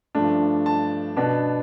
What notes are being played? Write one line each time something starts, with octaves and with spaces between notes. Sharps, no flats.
G2 F3 A3 D4
A5
B2 B3 D4